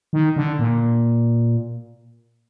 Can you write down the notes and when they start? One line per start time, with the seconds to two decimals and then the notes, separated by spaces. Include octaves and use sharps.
0.13 D#3
0.36 D3
0.59 A#2